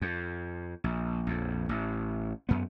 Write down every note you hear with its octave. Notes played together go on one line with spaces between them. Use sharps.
F2
A#1
A#1 F2
A1
F#2 B3